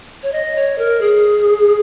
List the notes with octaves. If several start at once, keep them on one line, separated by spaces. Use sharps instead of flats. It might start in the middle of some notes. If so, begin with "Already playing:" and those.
C#5
D#5
C#5
A#4
G#4